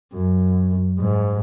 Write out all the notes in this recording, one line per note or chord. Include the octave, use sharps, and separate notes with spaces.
F#2
G#2